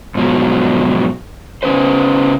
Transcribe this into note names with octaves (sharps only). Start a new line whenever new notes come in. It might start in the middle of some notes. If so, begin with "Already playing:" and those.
G#2 B2 F3 F#3
C#3 C#4 B4 C5